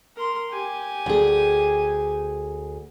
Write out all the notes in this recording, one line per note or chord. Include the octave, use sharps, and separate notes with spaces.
A#4 C6
G4 G#5
D2 G#4